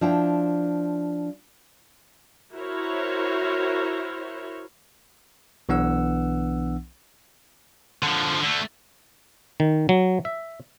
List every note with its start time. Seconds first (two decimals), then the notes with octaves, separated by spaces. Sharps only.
0.01 F3 D4 E4 G5
2.53 E4 F#4 A#4 C5 C#5
5.69 B1 E3 B3 D4 F#5 E6
8.03 D3 F3
8.43 D3 A3
9.60 D#3
9.89 F#3
10.25 E5